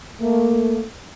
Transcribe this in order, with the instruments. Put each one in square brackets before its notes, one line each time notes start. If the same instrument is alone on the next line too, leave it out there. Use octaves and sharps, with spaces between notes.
[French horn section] A3 A#3